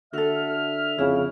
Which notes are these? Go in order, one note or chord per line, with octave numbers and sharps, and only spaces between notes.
D3 F#4 A4 E5 F6
F2 C#3 E4